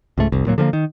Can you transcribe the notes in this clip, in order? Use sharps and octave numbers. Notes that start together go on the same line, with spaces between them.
C#2 G#2 A3
F1 C2
D1 A#2 F#3 A#3
D3 F3 G#3 A#3
D#3